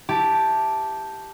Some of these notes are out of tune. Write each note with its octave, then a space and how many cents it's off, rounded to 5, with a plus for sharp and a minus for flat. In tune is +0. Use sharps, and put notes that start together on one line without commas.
E4 +0 G4 +0 A5 +0